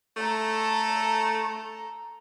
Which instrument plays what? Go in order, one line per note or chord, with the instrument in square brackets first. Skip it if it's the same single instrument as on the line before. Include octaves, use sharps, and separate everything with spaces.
[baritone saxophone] A3 [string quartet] A4 A#5